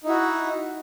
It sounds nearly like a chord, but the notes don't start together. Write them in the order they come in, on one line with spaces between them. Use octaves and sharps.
D#4 E4 F#4